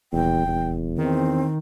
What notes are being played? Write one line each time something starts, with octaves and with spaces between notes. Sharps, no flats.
D#1 E2 G5
E2
D#3 C4